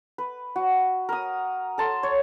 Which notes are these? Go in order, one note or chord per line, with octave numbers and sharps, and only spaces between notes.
B4
F#4
A#4 D#6
A4 A5 C6
C#5